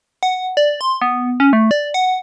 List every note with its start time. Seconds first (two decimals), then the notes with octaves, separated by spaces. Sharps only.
0.23 F#5
0.57 D5
0.81 C6
1.02 B3
1.40 C#4
1.53 A3
1.71 D5
1.94 F#5